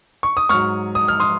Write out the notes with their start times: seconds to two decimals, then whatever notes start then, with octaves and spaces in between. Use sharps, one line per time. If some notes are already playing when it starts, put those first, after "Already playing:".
0.23 C#6
0.37 D#6
0.49 G#2 F#3 C#6 F6
0.95 D#6
1.08 F6
1.20 C6 D#6